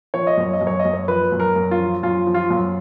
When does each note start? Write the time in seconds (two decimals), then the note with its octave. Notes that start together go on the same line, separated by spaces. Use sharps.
0.14 F3 C#5
0.27 D#5
0.37 F#2 C#5
0.53 D#5
0.61 F#2
0.67 C#5
0.79 D#5
0.85 F#2
0.93 C#5
1.08 F3 B4
1.32 F#2
1.40 A#4
1.56 F#2
1.71 F4
1.79 F3
2.03 F#2 F4
2.27 F3
2.34 F4
2.50 F#2